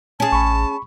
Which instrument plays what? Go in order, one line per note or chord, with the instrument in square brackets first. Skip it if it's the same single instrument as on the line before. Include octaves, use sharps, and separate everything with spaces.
[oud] C#4 G#4 [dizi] A5
[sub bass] A1 [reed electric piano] B5 C#6